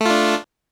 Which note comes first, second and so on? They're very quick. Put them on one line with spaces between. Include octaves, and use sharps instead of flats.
A3 F4 D4